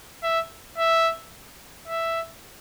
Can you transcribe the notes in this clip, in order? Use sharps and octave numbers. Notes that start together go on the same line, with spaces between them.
E5
E5
E5